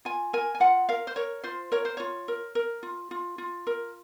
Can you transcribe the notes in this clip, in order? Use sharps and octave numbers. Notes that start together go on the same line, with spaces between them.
F4 G#5
A#4 G#5
G#5
F4 F#5
A#4 F5
C5
A#4 C#5
F4 C5
A#4 C#5
C5
F4 C#5
A#4
A#4
F4
F4
F4
A#4